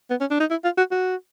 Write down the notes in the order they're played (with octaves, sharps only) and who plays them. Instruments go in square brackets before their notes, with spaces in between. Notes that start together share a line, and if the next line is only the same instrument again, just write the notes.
[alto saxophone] B3
C#4
D4
D#4
E4
F4
F#4
F#4